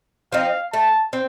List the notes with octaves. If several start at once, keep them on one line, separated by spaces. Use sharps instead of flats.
F3 C4 D#4 F5
A3 A5
C4